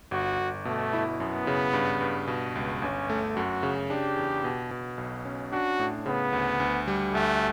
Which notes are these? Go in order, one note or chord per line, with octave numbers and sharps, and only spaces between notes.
G1 F#4
G1
B2 A3
E4
F#2 B3
C#3
G2
G2
B2
C#2
G1 C#4
A3
F#2 F#4
C#3
D4 G4
E2
B2
B2
B1
C#4
D4 F#4
A2
C#3 B3
D2
D2
G3
D2 A3